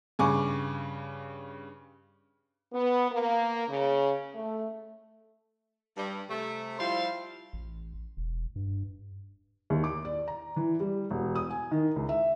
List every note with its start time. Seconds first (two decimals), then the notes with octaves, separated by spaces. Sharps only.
0.19 G2 C#3 G#5 C#6 D6
2.73 B3
3.10 A#3
3.68 C#3
4.35 A3
5.97 G2 G3
6.30 C3 A3
6.78 F3 G3 E4 C5 F5 C6
7.53 A1
8.17 E1
8.56 G2
9.70 D#2
9.84 D6
10.05 D5
10.28 A#5
10.56 E3
10.80 G3
11.10 E1
11.35 D#6
11.51 G#5
11.71 D#3
11.96 C#2
12.09 E5